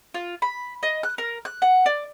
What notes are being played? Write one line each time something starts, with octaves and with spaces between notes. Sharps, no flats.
F4
B5
D#5
F#6
A#4
F#6
F#5
D5